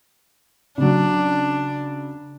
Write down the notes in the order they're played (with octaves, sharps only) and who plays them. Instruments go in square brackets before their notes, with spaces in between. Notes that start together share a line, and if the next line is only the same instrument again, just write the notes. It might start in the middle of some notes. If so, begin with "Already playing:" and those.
[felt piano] C#3 F#3 [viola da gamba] D4